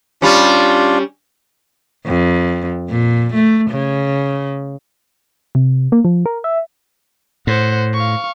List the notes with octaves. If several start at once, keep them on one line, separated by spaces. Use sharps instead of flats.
G3 C#4 D4 F4
F2
A#2
A3
C#3
C3
A#3
F3
A#4
E5
A2 C5 F#5
F5 C#6